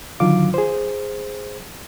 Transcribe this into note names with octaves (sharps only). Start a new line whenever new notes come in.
D3 D#3 F#3 F4 F5 D6
G#4 C5